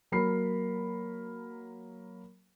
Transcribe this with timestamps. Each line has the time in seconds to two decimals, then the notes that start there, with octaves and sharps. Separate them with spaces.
0.12 F#3 A#3 A#4 B5 C7